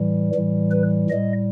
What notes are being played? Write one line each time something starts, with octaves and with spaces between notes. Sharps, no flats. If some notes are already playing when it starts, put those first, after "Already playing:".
Already playing: A2 E3 G3
A2 E3 G3
B4
A2 G3 D#5